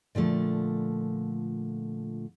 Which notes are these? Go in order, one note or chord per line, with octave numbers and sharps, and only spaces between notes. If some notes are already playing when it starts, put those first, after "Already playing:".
A#2 D3 F3 A3